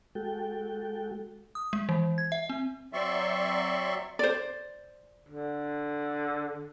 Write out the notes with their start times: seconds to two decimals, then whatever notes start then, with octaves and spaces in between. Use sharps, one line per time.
0.15 G#3 F#4 A4 G5
1.55 D#6
1.73 G#3
1.89 E3
2.18 G#6
2.32 E5
2.49 C4
2.93 F#3 C4 D5 E5 C6 C#6
4.19 C5 D5
5.28 D3